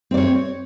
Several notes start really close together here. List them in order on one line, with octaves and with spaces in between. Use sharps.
C4 D5 C#5